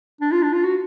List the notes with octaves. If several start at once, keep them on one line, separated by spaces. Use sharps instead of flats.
D4
F4
D4
F4
F#4